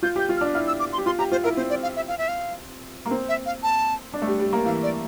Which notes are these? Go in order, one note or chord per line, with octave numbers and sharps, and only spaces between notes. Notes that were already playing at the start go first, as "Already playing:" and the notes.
F4 G6
G4 G6
F4
F6
D4
E4 F6
E6
D6
C6
G4
F4 C6
G4 A#5
F4 C5
E4 A#4
C4 C5
D5
F5
E5
F5
E5
F5
A#3
C4
E5
F5
A5
D4
A3
G3
G3
A#3
E3 F5
D5